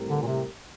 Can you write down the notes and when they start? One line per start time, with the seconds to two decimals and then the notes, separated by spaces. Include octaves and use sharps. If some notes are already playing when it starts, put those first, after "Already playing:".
Already playing: A2 G3 C4 G4 A#4
0.09 D3
0.22 A#2
0.26 C3